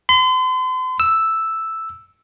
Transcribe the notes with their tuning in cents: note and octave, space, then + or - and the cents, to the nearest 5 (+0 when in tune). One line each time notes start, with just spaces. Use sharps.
C6 -40
E6 +0